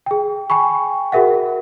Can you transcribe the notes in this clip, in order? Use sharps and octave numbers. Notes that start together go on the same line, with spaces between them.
G#4 G5
G5 G#5 B5 C#6
F#4 G#4 A#4 E5 F#5